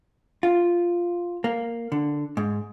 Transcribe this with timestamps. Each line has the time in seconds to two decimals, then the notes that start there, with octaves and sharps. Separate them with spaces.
0.43 F4
1.44 A#3
1.92 D3
2.37 G#2